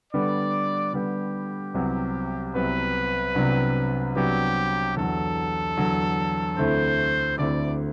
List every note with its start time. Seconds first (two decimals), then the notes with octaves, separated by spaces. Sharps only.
0.13 D3 G3 B3 D5
0.93 D3 G3 B3 G4
1.74 C2 C3 F#3 B3
2.55 C2 C3 F#3 B3 B4
3.35 C2 C3 F#3 B3 D4
4.16 C2 C3 F#3 B3 D4 G4
4.96 E2 D3 F#3 A4
5.77 E2 D3 F#3
6.58 D2 D3 A3 C4 E4 C5
7.38 D2 D3 A3 C4 E4 D5